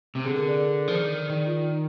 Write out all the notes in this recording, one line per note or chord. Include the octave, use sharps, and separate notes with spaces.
C3
D3 G#4
A#4
D5
F3
D#3
D#3 D5
F4
D#4